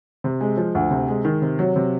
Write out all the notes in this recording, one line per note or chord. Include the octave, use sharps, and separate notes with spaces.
C3
G#3
F3
D2
C3
G#3
D#3
C3
F#3
C3